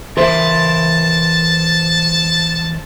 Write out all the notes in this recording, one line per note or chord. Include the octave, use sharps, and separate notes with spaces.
E3 A#4 C5 E5 A5